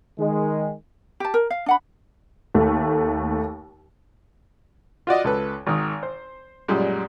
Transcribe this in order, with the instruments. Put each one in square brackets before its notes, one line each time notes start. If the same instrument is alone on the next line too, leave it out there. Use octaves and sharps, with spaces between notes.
[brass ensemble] D#3 G#3
[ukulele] G4 A5
A#4
F5
D4 F#5 B5
[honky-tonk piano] D#2 A3
[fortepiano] F4 F#4 D5 D#5
C#2 A4 B4
G#1 D#3
C5
F#2 A#2 G3 G#3